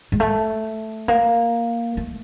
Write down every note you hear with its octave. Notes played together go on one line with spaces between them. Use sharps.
G#3
A3
A#3
A3